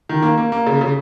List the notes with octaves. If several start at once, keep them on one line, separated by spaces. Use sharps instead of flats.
D#3
A#3
A#3
A#3
C#3
C#3